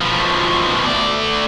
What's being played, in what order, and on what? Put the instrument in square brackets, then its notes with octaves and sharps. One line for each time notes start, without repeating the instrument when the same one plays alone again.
[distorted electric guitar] B2 F3
A3 D5